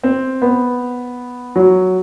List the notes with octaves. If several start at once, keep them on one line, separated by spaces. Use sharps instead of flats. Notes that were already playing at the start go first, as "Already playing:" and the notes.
C4
B3
F#3